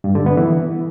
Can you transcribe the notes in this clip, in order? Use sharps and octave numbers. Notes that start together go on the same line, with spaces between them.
G2
D3
B3
E3